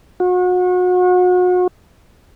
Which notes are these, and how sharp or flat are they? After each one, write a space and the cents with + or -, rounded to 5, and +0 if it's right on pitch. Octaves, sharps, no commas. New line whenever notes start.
F#4 -35